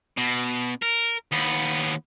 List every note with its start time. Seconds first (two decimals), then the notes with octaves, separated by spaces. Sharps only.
0.17 B2
0.82 A#4
1.32 D#2 B3